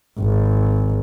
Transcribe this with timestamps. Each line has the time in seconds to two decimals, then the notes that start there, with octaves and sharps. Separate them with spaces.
0.20 G#1